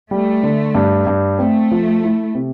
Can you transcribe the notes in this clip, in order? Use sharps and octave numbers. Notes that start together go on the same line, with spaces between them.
G3 A3
D3
G2
G2
A3 C4
F3
E4
C3